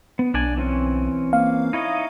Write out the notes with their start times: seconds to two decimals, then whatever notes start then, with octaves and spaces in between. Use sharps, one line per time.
0.19 B3
0.34 B1 D4 D5 G#5
0.57 E3 C4 C#4
1.33 A#3 F5
1.73 D#4 E4 C#5 D#5